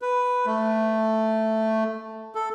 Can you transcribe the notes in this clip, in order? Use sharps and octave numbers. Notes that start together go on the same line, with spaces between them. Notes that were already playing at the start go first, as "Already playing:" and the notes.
B4
A3
A4